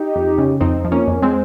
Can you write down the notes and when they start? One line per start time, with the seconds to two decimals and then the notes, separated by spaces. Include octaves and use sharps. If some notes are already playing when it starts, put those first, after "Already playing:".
Already playing: D#4 G4
0.15 F2
0.38 C#3
0.60 F2 C4 D#4
0.85 F3
0.92 A#3 C#4
1.07 F2
1.22 G#3 C4